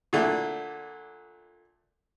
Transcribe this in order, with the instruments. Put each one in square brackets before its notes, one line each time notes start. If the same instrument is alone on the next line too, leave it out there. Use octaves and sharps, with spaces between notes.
[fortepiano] A#2 D3 A3